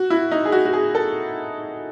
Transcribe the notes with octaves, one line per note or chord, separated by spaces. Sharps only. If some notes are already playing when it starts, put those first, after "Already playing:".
Already playing: F#4
E4
D#4
G#4
F#4
F#4
G#4
A4